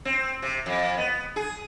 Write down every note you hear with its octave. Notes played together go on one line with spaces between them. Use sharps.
C4
C3
F2
B3
G#4